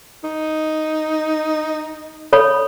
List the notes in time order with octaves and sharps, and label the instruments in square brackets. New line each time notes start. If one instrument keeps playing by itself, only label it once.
[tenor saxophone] D#4
[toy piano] A4 C#5 B5